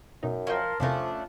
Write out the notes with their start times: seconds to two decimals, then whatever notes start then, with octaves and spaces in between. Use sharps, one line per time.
0.23 F#2 B2 D#4
0.47 F3 A#4 C#5 D#5 G5 A5 C6
0.80 E2 C3 F3 A3 C#4 D4 F4 A#4